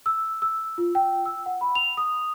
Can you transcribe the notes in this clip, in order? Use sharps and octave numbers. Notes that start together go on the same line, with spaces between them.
E6
E6
F4
G5
E6
F#5
B5
F7
D#6